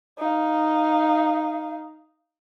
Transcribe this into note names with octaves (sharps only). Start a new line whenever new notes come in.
D#4 F5